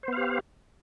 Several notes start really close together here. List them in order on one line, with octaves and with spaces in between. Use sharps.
C5 B3 F5 G4